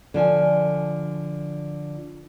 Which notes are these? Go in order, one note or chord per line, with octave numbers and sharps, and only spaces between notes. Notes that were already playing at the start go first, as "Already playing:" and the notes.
D3 F3 G#5